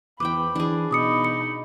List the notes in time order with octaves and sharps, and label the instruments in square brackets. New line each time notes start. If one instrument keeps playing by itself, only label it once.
[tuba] E2 [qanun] B4 C5 G5 [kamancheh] B5 [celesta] D6
[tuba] E3 [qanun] D4 G#4
[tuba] B2 [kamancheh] D#4 B5 [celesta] D6 D#6 C#7
[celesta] C#7